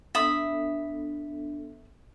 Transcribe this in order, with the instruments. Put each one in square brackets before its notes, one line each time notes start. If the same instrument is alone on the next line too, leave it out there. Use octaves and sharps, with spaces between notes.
[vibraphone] B3 D4 A4 [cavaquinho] E5 B5 D#6